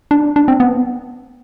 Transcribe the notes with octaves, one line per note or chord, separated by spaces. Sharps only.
D4
D4
C4
B3